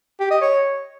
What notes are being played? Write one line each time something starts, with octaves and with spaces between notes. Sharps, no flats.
G4
D#5
C#5